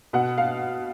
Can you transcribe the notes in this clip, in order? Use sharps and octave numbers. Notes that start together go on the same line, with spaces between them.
B2 F#5
F5